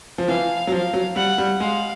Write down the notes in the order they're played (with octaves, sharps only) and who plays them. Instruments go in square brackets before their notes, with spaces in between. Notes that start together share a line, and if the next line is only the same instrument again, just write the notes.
[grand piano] F3
[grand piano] E3 [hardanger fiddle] F5
[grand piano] F#3
[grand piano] F3 [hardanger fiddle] F5
[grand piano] F#3
[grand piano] G3 [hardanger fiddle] F#5
[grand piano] G3
[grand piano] G#3 [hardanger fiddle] F5